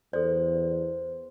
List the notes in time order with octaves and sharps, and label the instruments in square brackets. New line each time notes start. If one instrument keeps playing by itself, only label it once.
[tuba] E2 [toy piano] A4 D5 [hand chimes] C5